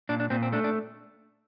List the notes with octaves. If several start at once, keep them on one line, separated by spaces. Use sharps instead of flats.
A#2 D4
D4
A#2 C4
C4
A3 D4
D4